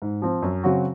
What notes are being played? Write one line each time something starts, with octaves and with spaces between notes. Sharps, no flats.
G#2
F3 C4
F#2
C#3 F#3 C4 F#4